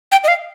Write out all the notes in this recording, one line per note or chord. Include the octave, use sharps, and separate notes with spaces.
G5
D#5
F5